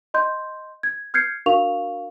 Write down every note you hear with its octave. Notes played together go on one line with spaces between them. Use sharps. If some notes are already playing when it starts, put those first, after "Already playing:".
D#5 C6 G6
G#6
F6 G6 G#6 C7 C#7
D4 F#4 A#4 F5 C#6 F7